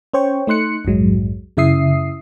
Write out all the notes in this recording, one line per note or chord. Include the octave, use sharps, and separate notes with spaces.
C#4 C5 C#5 G5 C#6
A3 D#4 C6 F#6 C#7
A#1 F2 G#2 F#3 G#3
F#2 C#3 E4 E5 D#6 C7